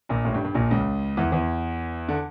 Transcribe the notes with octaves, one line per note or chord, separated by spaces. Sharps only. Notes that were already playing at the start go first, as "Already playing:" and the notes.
A#1 A#2
A1 A2
G2
G2
A#1 A#2
C#2 C#3
E2 E3
E2 E3
D3